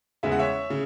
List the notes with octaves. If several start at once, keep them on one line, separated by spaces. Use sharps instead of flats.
E2 C#3 G#3 B3 E5
F#5
C#5 E5
C#3